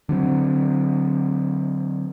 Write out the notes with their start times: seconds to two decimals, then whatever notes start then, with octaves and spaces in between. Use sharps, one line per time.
0.09 D3 F#3 C4